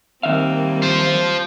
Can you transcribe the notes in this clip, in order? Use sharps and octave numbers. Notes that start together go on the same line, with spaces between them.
D#3 G3 A#3 C4 E5 F5
F4 C5